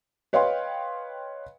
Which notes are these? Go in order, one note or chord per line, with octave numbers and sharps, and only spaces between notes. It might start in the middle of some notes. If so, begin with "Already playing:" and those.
B4 C#5 D#5 F5 G5 C6